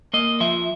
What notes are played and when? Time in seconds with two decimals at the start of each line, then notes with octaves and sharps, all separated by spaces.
0.13 A#3 D#5
0.40 F3 E5